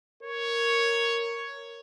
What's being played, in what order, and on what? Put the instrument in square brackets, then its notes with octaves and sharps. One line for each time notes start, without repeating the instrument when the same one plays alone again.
[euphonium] A#4 [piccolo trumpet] C#5